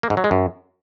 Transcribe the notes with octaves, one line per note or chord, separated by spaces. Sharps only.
A#3
G#2
F#3
G#3
F#2